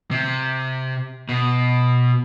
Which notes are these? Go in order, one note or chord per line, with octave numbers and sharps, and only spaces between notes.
C3
B2